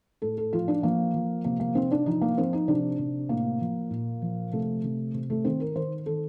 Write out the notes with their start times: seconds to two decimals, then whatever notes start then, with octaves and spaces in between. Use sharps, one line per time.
0.22 A2 A4
0.38 A4
0.53 F3 F4
0.68 D4
0.83 F3 A#3
1.14 F3
1.45 C3 A#3
1.60 A#3
1.75 C3 C4
1.91 D4
2.06 F3 D#4
2.21 A#3
2.38 F3 C4
2.53 D#4
2.68 C3 D4
2.99 C3
3.29 A2 A#3
3.60 F3
3.91 A#2
4.22 F3
4.52 C3 A3
4.84 C3
5.14 C3
5.30 A3
5.45 D#3 C4
5.60 A#4
5.75 D#3 C5
6.06 D#3 A4